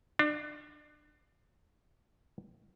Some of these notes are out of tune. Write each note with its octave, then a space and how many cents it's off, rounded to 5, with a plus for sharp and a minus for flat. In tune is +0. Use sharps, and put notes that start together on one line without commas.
D4 +30